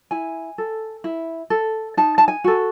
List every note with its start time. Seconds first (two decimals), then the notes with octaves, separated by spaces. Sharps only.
0.11 E4 G#5
0.58 A4
1.04 E4
1.50 A4
1.97 D#4 A5
2.18 A5
2.28 G#5
2.44 F#4 A4